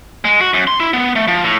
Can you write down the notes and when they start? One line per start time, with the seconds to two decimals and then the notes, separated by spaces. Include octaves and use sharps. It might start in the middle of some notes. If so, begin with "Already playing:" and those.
0.25 G#3
0.41 F#4
0.54 F#2
0.67 C6
0.80 E4
0.94 B3
1.16 A3
1.28 F3
1.44 A2